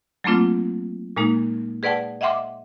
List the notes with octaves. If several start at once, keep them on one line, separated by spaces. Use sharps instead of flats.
F#3 A3 A#3 C4 D4 F4
A#2 G#3 A#3 D#4
G#4 B4 D5 F#5 G5 A5
D#5 E5 F#5 G5 C6 D6